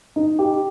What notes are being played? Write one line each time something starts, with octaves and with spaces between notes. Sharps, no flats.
D#4
G4